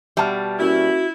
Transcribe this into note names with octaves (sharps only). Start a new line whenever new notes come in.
B2 G3 E5 A5 F6
A#3 C#4 E4 F#4